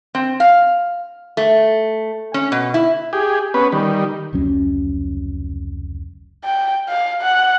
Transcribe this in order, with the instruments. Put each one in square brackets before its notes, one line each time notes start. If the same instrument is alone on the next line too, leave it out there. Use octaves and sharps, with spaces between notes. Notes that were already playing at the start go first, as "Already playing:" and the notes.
[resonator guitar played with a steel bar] C4
F5
A3
C#4
B2
E4
[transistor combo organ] G4 G#4
B3 C#4 B4
D#3 G3
[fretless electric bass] F1 C#2 F#3 C#4
[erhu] G5
F5
F#5